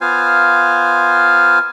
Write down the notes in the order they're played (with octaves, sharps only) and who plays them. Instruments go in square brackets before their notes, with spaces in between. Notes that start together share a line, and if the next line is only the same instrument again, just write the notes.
[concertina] B3 F4 C5 F5 G#5